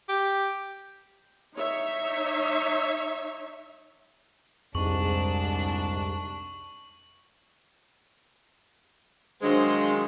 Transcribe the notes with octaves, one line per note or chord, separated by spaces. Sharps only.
G4
D#4 C#5 E5
C2 F2 G#2 D4 C#6 F#7
D#3 F#3 G#3 D4 C5 F5